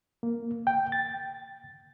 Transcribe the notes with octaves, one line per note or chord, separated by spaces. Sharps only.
A#3
G5
A6